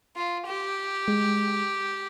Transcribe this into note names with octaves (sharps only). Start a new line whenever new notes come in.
F4
G4
G#3